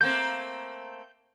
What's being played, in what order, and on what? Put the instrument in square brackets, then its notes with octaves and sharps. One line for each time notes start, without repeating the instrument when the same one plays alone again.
[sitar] A3 A#3 C4 [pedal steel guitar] G6